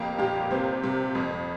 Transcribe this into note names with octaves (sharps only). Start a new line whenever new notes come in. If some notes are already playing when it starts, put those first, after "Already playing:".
Already playing: F2 A#3 G4
A#2 G4
C3 C5
C3
F2